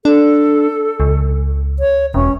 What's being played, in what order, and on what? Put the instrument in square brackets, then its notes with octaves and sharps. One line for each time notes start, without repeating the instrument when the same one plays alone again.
[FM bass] D4 [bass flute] A4
[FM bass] C#2
[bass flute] C#5
[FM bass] E1 [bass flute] C#4